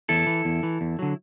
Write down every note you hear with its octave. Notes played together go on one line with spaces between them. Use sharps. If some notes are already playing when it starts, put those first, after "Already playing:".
E2 E4 A4
E3
E2
E3
E2
D3 F#3